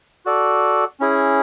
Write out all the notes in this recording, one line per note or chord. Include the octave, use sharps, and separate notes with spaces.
F#4 A4 D5
C#4 E4 G#4